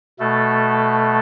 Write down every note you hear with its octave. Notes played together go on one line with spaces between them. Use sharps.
B2 A3 A4